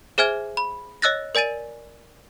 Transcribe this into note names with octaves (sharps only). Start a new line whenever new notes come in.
G#4 C5 E5 G#5 F6 G#6
B5
C#5 D#5 E6 F#6 A6 A#6
A#4 D5 G#5 A6 D#7